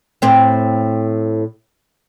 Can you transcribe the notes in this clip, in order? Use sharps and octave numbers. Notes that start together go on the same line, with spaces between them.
A2 C4